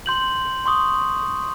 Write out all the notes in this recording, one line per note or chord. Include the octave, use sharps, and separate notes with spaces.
C6 G6 F#7
C6 C#6 D#6